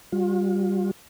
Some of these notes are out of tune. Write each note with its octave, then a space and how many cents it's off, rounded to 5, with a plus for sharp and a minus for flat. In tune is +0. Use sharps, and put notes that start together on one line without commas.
G3 +0 F4 +40